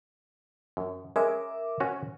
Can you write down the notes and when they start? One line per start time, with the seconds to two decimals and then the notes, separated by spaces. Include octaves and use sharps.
0.77 F#2
1.16 G#3 C#4 A#4 E5 D6
1.80 C#4 F#4 C#5